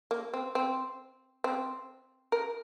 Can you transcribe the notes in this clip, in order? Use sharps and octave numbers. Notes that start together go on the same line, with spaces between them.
A#3
C4
C4
C4
A#4